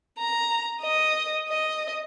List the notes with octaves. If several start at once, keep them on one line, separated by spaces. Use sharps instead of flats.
A#5
D#5
D#5